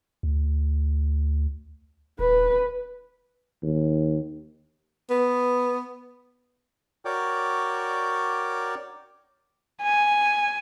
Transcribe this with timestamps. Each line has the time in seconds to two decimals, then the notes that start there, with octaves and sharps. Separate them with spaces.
0.23 D2
2.19 D#1 B4
3.63 D#2
5.10 B3
7.05 F#4 A#4 C#5 D5 G5 D6
9.82 G#5